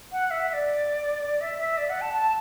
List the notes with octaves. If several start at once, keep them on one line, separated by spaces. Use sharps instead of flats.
F#5
E5
E5
D5
E5
E5
D5
F#5
A5
A5